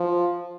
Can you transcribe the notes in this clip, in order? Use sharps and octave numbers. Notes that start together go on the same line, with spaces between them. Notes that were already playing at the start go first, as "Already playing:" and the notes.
Already playing: F3